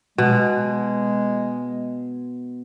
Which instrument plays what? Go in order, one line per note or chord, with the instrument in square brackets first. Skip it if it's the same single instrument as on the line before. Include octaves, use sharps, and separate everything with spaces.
[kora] B2 [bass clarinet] G#3